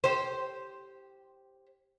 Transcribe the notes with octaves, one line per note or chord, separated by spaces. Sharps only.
G4 C5